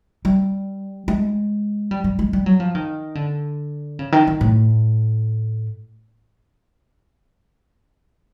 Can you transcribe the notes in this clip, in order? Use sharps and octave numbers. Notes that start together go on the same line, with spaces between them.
G3
G#3
G3
G3
G#3
G3
F#3
F3
D#3
D3
C#3
D#3
D#3
A2